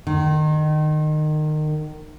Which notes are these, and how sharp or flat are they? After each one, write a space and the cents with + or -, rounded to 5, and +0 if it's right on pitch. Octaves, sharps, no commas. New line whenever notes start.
D#3 -25